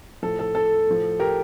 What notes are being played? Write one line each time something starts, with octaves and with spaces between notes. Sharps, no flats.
A2 F3 A4
A4
A4
A2 F3
G4 A#4